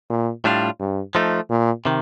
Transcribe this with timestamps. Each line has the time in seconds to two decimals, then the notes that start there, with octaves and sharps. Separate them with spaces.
0.10 A#2
0.44 A2 G3 D4 F4
0.80 G2
1.15 F3 A3 D#4
1.50 A#2
1.85 C3 D#3